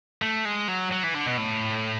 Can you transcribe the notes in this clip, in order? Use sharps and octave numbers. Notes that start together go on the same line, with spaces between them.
A3
G#3
F#3
F#3
E3
D3
B2
A2